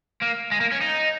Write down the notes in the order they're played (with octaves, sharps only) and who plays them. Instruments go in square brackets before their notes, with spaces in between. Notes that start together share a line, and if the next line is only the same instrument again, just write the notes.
[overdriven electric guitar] A#3
G#3
A#3
C#4
D#4